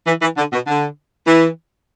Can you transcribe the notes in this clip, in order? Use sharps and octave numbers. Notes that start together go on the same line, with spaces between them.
E3
E3
D3
B2
D3
E3